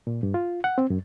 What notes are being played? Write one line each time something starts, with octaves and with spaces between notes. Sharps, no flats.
A#2
G2
F4
F#5
C4
F#2